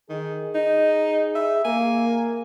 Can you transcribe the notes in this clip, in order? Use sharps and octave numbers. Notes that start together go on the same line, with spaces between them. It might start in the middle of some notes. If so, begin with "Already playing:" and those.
D#3 G#4
D#4
E5
A#3 G#5